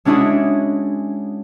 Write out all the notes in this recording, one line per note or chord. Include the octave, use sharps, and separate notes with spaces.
G#3 C#4 D4 E4 F#4 G#4